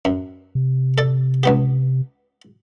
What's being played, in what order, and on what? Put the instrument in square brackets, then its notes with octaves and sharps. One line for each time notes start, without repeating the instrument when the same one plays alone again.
[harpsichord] F#2
[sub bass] C3
[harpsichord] A4 D5
C#2 B3 G4